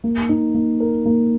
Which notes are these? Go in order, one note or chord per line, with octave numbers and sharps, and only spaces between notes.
A#3
D#4
A#3
A#4
A#3